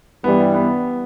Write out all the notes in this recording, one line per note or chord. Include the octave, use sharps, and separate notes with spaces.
G2 E3 G3 B3
B3